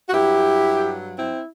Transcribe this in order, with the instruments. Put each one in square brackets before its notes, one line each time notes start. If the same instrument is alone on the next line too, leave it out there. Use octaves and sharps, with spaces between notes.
[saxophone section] F#4
G2 F#3 E4 G4
C4 E4